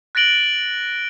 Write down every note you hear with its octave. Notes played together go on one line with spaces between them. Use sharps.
F#6 A6 A#6 D7 F#7 G7